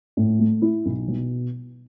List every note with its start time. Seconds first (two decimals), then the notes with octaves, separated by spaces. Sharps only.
0.17 A2
0.39 A3
0.62 E4
0.86 B1
1.08 B2